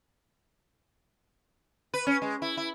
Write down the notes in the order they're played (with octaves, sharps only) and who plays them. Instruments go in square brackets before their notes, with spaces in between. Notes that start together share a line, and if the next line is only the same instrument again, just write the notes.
[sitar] B4
C#4
G#3
E4
E4